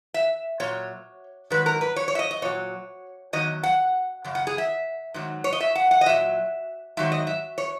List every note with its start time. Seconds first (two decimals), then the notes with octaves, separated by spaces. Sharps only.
0.14 E5
0.60 A#2 F#3 C#5
1.50 G#2 D#3 F#3 B4
1.66 A#4
1.81 B4
1.96 C#5
2.08 C#5
2.15 E5
2.19 D#5
2.31 D#5
2.42 A#2 F#3 C#5
3.33 E2 D#3 F#3 D#5
3.63 F#5
4.24 F#2 C#3
4.35 F#5
4.47 G#4
4.58 E5
5.14 G#2 D#3 F#3
5.44 C#5
5.53 D#5
5.60 E5
5.75 F#5
5.91 F#5
6.01 D#5
6.06 A#2 F#3 E5
6.97 G#2 D#3 F#3 E5
7.12 D#5
7.27 E5
7.58 C#5